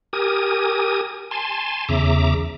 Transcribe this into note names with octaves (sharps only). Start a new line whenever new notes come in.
G4 A#4 G#5 D#6
G#5 A5 C6
E2 C#3 E5 A#5 D6